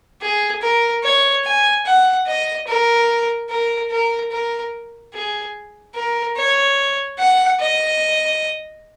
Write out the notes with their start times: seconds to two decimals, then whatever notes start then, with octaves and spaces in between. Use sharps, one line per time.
0.21 G#4
0.62 A#4
1.04 C#5
1.45 G#5
1.85 F#5
2.26 D#5
2.67 A#4
3.50 A#4
3.91 A#4
4.31 A#4
5.14 G#4
5.95 A#4
6.37 C#5
7.19 F#5
7.60 D#5